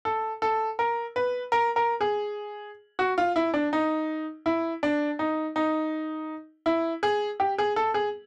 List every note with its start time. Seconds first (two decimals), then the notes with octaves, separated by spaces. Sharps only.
0.05 A4
0.42 A4
0.79 A#4
1.16 B4
1.52 A#4
1.76 A#4
2.01 G#4
2.99 F#4
3.18 F4
3.36 E4
3.54 D4
3.73 D#4
4.46 E4
4.83 D4
5.19 D#4
5.56 D#4
6.66 E4
7.03 G#4
7.40 G4
7.58 G#4
7.76 A4
7.94 G#4